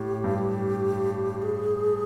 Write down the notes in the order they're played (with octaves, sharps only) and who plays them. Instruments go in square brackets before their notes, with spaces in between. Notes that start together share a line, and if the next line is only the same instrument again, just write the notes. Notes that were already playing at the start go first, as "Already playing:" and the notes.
Already playing: [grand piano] A2 [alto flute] G4
[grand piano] G2
[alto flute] G#4